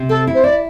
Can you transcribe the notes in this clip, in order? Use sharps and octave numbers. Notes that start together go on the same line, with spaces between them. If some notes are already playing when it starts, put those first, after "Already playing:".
Already playing: C3
C4 A4
E4
C5
E4 D5